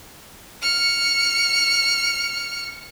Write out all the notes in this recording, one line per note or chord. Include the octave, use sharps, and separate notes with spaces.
F6 C#7